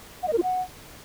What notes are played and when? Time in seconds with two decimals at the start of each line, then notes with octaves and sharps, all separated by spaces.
0.23 F#5
0.28 D#5
0.33 A#4
0.38 F4
0.43 F#5